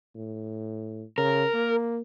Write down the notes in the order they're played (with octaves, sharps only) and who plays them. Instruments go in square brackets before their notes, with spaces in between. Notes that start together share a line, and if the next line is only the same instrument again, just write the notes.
[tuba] A2
[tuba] C#3 [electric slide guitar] A#4
[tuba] A#3